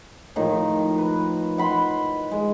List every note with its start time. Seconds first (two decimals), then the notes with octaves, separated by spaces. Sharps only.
0.36 A2 D#3 F3
0.98 B4
1.58 F#5 B5 C6
2.31 G#3